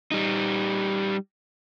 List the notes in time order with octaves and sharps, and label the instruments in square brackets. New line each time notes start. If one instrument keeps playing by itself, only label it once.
[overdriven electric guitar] G3 D#4